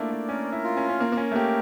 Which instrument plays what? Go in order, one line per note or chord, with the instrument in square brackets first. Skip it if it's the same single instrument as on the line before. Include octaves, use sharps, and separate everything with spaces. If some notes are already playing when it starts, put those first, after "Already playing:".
Already playing: [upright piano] A3 A#3 D4 E4 F4 [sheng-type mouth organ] D5
[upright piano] A3
[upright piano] C#4 [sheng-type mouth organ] A#4
[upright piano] E4
[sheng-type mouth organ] F4
[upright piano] C#4
C#4
[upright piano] A#3 [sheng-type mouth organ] A#4
[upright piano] A#3
C#4
A3
[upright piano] A#3 [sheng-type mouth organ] G4